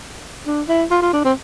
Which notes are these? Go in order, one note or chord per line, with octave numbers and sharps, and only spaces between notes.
D4
E4
F4
F4
D4
C4